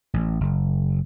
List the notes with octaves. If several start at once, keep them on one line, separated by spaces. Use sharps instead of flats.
A1
F#1